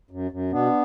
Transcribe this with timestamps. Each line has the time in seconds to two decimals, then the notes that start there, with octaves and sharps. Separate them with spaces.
0.11 F#2
0.31 F#2
0.52 B2 B3 D4